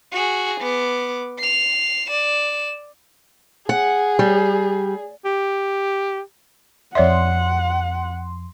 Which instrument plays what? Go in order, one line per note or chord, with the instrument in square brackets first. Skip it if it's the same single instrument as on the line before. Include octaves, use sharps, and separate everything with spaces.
[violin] F#4 G#4
B3 D6
C7 F7
D5 E7
[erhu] G#4 [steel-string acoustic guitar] F#5
[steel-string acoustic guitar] G3
[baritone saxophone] G4
[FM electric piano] F2 C6 [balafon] C#5 D5 E5 [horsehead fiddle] F#5